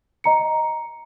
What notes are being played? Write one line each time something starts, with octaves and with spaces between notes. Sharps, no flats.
D#5 A#5 C#7